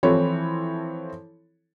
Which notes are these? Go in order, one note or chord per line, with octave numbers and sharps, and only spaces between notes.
E3 F3 C4 E4 A4 C#5